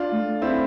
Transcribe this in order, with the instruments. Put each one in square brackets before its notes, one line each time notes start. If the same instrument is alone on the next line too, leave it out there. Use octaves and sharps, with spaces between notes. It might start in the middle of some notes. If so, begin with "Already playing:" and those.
Already playing: [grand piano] D4 F4
[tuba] A3
[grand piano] C4 E4